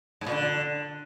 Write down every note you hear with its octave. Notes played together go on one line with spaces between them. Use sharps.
G#2
A#2
D3